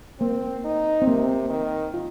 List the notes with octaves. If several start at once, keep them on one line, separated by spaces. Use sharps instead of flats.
A#3 C4
D#4
C4
C3 A#3
D#3
F4